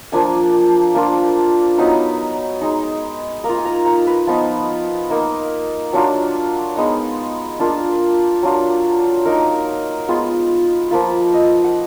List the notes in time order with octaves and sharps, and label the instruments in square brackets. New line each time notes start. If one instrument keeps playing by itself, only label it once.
[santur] F3 A#3 D4 G#5
A#3 D4 F4
F#3 B3 D#4 B5
G#3 D#4
A#3 A#5
F4
G#5
A#5
A#5
B4
F3 B3 D#4 F4
A#3 D#4
F#3 D4 F4
G#3 B3 D#4
A#3 D4 F4
F#3 D4 F4
A#3 D#4 A#4
G#3 B3 F4
F3 A#3 F4 B4
D#5
F#5